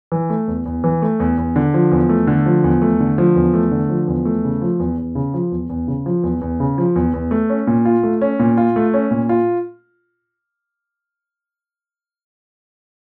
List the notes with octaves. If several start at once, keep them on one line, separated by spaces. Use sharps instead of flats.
E3
A3
E2
E2
E3
A3
E2
E2
D3
F3
E2
A3
D3
F3
E2
A3
D3
F3
E2
A3
D3
F3
E2
A3
C#3
F3
E2
E2
C#3
F3
E2
E2
C#3
F3
E2
E2
C#3
F3
E2
E2
A3
C#4
A#2
F4
A3
C#4
A#2
F4
A3
C#4
A#2
F4